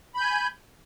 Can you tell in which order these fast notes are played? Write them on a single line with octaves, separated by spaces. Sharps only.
B5 G6 G#5